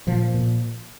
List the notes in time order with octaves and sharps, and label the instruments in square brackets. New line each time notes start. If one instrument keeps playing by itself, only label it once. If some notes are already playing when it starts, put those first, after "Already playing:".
[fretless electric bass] A#2 F3
A#2